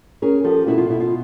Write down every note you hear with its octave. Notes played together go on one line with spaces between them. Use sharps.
C#4 G#4 A#4
F3 G4 A4
B2 E4 F#4
F4
B2 E4
F4